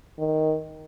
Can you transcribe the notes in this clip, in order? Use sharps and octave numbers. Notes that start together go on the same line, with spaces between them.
D#3